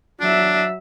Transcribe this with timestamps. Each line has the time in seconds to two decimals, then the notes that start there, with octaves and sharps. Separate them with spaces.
0.21 F#3 D4 E5